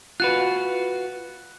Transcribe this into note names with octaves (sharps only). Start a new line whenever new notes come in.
F4 F#4 B4 F#6